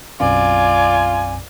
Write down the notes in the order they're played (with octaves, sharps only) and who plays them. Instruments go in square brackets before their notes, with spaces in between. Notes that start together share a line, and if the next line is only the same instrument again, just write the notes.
[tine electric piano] B1 F#2 C4 [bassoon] F4 [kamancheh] D5 [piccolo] G#5